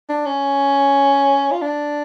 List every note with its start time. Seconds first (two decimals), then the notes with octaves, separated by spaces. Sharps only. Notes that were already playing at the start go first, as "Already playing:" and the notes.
0.09 D4
0.26 C#4
1.52 F4
1.62 D4